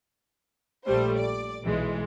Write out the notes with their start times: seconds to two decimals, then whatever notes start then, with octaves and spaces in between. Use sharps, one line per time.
0.86 A#1 G3 A3 C5
1.17 D5
1.63 B1 E3 G#3